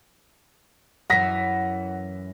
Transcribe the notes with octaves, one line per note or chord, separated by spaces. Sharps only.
F#2 E3 F#5 A#6 B6